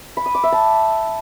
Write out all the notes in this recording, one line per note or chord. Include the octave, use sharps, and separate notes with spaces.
B5
D#6
D6
E5
A5